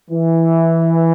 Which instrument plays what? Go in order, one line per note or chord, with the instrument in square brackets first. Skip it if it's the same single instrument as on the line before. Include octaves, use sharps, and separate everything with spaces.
[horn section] E3